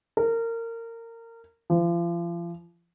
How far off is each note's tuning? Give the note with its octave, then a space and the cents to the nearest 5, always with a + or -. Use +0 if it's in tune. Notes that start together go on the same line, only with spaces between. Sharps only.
A#4 -25
F3 -35